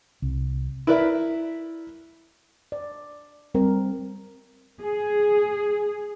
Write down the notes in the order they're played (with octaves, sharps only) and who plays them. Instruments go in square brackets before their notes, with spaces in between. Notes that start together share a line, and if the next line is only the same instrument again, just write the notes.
[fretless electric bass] C2
[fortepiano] E4 A#4 B4 D5 E5
[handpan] D5
G3 C4 A#4
[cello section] G#4